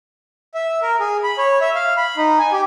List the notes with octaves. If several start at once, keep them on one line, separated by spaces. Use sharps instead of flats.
E5
A#4
G#4
B5
C#5
E5
F5
B5
D#4
G#5
G4